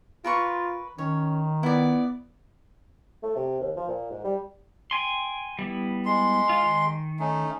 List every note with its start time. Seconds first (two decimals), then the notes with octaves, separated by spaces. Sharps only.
0.24 F4 A#4 B4 C#6
0.98 D#3 C#4 C#5
1.63 B3 E4 D5
3.23 A3
3.36 C3
3.60 D#2
3.76 F3
3.88 A#2
4.11 G#2
4.24 G3
4.91 G5 G#5 C6
5.59 G3 B3 E4
6.06 G#3 C6
6.49 F4
6.63 D#3
7.20 A3 C#4 D#4